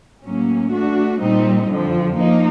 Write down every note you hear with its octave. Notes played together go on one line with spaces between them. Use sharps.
A2 F#3 A#3 C#4
A3 D4 F#4
A#2 G3 C4 D#4
F2 D3 F3
F3 A#3 D#4